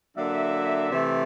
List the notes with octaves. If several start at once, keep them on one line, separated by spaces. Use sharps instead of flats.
D3 F#3 A#3 D4 E5
C3 E3 A3